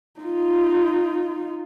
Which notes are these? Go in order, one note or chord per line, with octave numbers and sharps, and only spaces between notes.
D#4 F4